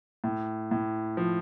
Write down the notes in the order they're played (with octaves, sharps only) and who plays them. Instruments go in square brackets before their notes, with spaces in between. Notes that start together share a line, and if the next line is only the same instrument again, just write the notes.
[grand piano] A2
A2
F3